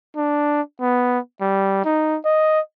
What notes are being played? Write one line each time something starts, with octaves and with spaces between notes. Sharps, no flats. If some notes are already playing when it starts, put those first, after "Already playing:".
D4
B3
G3
D#4
D#5